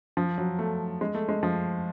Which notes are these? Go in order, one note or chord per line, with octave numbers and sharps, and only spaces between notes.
F3
F#3
A3
G#3
A3
G#3
F3